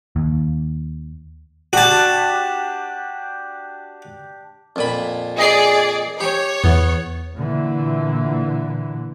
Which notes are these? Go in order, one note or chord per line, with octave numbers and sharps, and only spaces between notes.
D#2
D4 F#4 G4 A5
F2 A#2 B5
G#4 D5 D#5 C7
G4 C#5
E2 B3
A#2 D3 E3